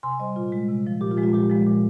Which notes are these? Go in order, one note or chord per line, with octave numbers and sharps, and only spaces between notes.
C3 G#5 C6
G3 C5 D#5
A#2 F4
G#3
C3
F3 G#3
A#2 G4
F4
F3 G#3
F4
A#2 G4
F3 G#3
A#2